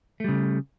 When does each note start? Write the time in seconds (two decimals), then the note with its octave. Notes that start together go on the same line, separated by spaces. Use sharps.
0.20 A3
0.24 G3
0.29 C#3